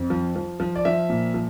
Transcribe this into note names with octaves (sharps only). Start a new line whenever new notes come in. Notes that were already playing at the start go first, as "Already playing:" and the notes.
Already playing: F2
F3
F3
F3
D5
F3 E5
A#2
F3